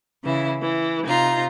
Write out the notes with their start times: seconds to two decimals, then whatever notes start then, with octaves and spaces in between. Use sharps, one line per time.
0.23 C#3 E3 E4
0.61 E3
1.05 C3 D#4 F4 A#5